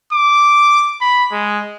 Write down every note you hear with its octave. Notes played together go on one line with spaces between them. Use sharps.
D6
B5
G#3